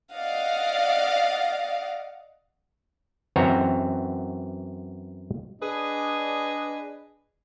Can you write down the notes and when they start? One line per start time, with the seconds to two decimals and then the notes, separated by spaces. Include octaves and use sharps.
0.11 D5 D#5 F5 F#5
3.36 F#2 E3 C4 F#4 C#5 A#5
5.61 D4 G#4 B4 D#5